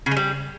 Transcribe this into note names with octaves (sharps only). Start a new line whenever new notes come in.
C#3
G#3
G3